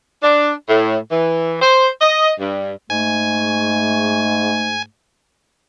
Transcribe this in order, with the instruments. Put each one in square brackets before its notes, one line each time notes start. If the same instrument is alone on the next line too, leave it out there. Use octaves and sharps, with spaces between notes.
[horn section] D4
A2
E3
C5
D#5
G2
[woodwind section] G#2 A3 [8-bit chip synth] G#5